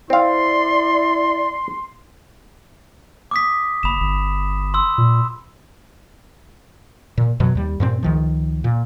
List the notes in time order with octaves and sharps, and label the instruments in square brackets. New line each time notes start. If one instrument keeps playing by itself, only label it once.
[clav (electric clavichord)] C4 F5 [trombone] E4 [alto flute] D5 [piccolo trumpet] C6
[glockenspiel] D6 D#6 B6
[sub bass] F#1 [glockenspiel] B5 E7
[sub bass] G1
[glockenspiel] C6 E6
[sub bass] A#2
[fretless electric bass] A#2
F2 B2 F#3
D#2 G3
G2 A#2 C4
C#2 D#3 F3
A#2